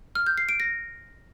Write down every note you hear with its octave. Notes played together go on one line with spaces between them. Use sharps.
F6
G6
C7
D7
A#6